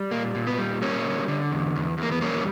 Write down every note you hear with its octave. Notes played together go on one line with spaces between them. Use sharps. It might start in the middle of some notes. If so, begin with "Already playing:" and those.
Already playing: G3
A#2 A#3
A#2
B3
G3
G3 A#3 C#4
D3
D3
E2
E2
E2
A#3
B3
G3 A#3 C#4